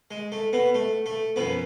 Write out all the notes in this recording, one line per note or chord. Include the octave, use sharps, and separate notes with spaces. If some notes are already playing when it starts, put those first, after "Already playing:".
G#3
A3
B2 B3
A3
A3
F#2 B2 F3 B3